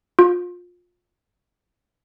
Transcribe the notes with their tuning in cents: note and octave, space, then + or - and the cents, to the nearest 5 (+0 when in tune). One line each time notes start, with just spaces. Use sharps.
F4 +25